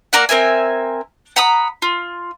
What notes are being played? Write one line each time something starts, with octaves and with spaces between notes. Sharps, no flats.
A#3 A#4 D5 F#5
C4 A#4 E5 G#5
F#5 A#5 B5 D#6
F4